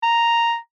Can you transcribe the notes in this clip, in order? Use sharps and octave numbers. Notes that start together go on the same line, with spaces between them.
A#5